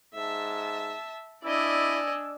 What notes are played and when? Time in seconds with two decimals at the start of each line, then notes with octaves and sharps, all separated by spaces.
0.14 G#2 E5 A5
1.44 D4 E4 D5 D#5 G#5 E6